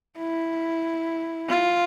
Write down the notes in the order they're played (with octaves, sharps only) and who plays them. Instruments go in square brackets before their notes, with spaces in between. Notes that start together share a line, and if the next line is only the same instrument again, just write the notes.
[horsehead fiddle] E4
F4